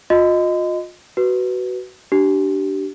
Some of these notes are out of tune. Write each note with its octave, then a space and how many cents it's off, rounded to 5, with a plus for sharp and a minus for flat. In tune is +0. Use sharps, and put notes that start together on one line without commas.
F4 +35 D#5 +0 C6 -45
F#4 +15 B4 +0
D4 +0 G4 -30